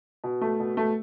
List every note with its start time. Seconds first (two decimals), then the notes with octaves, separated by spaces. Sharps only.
0.24 B2
0.41 A3
0.60 B2
0.77 A3